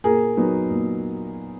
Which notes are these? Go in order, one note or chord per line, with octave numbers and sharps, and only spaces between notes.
A#2 G#4 A#4
F#3 B3 D#4
A#2